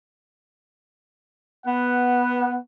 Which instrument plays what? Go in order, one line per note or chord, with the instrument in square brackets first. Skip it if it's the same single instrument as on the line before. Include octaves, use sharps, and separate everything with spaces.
[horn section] B3 F#5